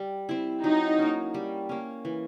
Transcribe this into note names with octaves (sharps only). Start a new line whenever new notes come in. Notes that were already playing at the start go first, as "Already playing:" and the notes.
Already playing: G3
C4 E4
F#3 D#4
A#3 C#4
G3
A#3 C#4
E3